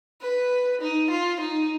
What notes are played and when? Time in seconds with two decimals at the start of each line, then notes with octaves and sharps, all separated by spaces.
0.21 B4
0.81 D#4
1.11 F4
1.40 D#4